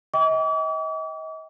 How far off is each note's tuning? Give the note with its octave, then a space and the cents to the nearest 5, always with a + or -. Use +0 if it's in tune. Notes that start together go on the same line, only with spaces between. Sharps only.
D#5 +40 G5 +0 D6 -45